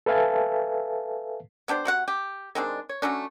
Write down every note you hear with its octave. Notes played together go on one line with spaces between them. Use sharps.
A4 B4 E5 F5 G#5 A5
B3 D4 G4 C5
C3 F#4 F#5
G4
D#3 G#3 C4 D4
C#5
F#3 A3 C#4 D4